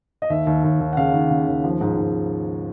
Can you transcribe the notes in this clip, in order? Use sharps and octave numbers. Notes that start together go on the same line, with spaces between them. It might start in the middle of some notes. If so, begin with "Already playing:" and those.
D#5
D#2 E5
D#2
D#2
D#2
F#5
C#3 F5
D#2
C#3
D#2
F3
G#2
G#2